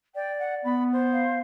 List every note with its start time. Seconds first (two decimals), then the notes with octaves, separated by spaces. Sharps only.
0.15 D5 G5
0.39 F#5
0.65 B3 B5
0.92 C5
1.13 F5